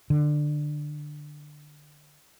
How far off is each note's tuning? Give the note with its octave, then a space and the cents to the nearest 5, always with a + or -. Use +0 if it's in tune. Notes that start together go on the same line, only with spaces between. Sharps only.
D3 +20